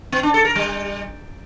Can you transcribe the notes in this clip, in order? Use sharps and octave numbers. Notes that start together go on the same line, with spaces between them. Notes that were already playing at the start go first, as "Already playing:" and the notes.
B3
D4
A4
A#4
G3